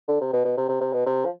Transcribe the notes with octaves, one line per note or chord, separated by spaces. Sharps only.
D3
C3
B2
B2
C3
C3
C3
B2
C3
F3